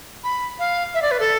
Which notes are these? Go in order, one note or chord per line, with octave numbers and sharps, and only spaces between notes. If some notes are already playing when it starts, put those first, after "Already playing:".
B5
F5
E5
D5
B4
A4